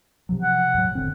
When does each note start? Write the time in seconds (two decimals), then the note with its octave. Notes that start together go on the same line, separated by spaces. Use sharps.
0.29 C3 F3 F#3
0.42 F#5
0.74 E2 A2 F#3
0.95 F#1 D3 C4